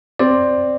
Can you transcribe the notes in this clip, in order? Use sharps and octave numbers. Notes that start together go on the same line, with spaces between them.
C4 D5